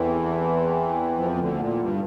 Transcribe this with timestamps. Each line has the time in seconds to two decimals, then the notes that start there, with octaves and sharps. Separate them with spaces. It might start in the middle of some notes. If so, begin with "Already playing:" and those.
Already playing: E2 E3 A3 C4 E4
1.18 F2 F3
1.39 D2 D3
1.60 A#2
1.80 G2